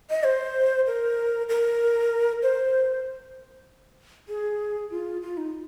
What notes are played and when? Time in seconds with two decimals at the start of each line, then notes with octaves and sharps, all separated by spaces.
0.10 D#5
0.25 C5
0.87 A#4
1.49 A#4
2.43 C5
4.29 G#4
4.91 F4
5.22 F4
5.37 D#4